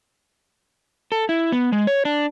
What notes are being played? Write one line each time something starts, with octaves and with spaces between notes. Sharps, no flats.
A4
E4
B3
G#3
C#5
D4